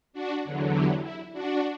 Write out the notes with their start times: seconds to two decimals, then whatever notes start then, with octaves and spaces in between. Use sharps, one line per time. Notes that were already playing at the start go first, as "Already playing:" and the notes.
0.13 D4 F#4
0.44 E2 D3 F#3
0.73 E4 G4
1.03 E4
1.33 D4 F#4